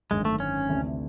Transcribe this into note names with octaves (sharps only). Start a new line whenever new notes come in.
G#1 F#2 D3 G#3
A3
C#4
D2 C3 E3 A3 D4